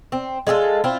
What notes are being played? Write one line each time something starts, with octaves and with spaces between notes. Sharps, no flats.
C4
G#3 F4 G#4 A4
C4 E4 F4